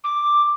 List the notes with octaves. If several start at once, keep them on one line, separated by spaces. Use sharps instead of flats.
D6